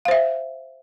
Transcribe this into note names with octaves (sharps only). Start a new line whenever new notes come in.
C5 E5 F5